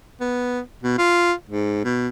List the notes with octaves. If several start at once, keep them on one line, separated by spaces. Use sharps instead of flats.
B3
B2
F4
G#2
B2